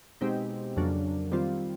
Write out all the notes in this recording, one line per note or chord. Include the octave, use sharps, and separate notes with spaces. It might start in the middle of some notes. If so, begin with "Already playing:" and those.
B2 G#3 C4 D#4 G4
F2 C#3 F#3 A#3 D4
D#3 G3 C4 F4